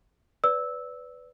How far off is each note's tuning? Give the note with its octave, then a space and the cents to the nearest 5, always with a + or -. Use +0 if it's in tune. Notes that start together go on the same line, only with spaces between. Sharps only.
B4 +10 D5 -20 E6 -10